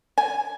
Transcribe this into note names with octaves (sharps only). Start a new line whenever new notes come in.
G#5